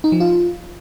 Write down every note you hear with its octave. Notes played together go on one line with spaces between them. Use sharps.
D#4
F3
F4